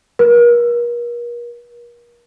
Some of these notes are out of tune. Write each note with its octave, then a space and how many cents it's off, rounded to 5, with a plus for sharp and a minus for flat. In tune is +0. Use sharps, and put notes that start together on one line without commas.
A#4 +40